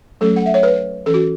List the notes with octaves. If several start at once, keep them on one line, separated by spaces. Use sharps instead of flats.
F#3 A3 C#4 A4
F#5
E5
C#5
B4
E3 C#4 A4
F#4